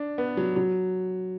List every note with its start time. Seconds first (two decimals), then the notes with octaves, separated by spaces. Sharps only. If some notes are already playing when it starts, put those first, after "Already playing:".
Already playing: D4
0.18 B3
0.37 F#3
0.56 F#3